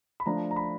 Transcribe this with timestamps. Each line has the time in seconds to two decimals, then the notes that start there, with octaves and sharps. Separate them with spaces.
0.20 B5
0.26 F3 A3 D4 A#5
0.51 A#5
0.56 B5